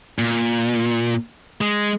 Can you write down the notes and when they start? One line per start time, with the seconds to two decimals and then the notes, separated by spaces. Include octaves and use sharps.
0.19 A#2
1.61 G#3